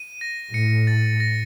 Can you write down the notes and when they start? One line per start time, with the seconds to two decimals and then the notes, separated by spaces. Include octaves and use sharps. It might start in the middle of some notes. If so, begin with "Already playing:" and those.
Already playing: D#7
0.21 A#6
0.54 A2 C#7
0.87 A6
1.20 A#6